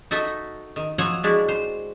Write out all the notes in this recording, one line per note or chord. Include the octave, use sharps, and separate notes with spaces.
D#4 F#4 A4 D#5 E5
D#3
F3 F#3 C5 C#5 F#5
G#3 D4 E4 F#4
C5